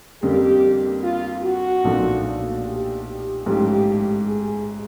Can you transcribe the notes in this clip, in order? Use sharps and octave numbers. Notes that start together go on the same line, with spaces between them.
F2 D3 G3 A#3 G4
F4
F#4
B1 A#2 F3 A3 D4
G4
A1 G#2 F3 A3 G4
G#4